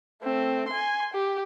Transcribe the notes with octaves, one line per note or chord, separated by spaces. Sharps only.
A3 C4
G#5 C6
G4